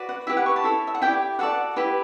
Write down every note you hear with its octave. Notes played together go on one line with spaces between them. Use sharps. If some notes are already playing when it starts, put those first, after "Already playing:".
Already playing: F#4 B4 D5
F#5
E4 G4 B4 E5
F#5
C#6
A5
E4 A4 C#5
E5
F#5
E4 G4 D5 G5
F#4 A4 D5 F#5
E4 G4 B4